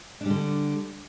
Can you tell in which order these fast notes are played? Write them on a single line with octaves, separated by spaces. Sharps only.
D4 G3 D3